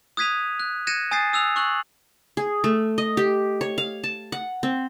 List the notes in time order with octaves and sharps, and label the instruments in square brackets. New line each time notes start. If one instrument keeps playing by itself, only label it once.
[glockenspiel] D#6 F#6 G#6 B6 D#7 F7
F#6
F#6 G#6 A#6 C#7 D#7 E7
G#5 D#6 G6 A6 C7
D#6 E6 F#6 F7
C#6 E6 F#6 F#7
[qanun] G#4
A3
D#5
G4
C#5
F5
A5
F#5
C4